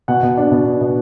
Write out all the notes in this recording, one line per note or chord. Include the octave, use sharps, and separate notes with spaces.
B2 F#5
B2
D4
B2
D4
B2